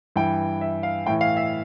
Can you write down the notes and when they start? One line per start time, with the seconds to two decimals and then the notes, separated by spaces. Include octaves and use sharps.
0.16 G2 E3 G5
0.61 E5
0.83 F5
1.06 A2 G5
1.09 E3
1.21 F5
1.37 E5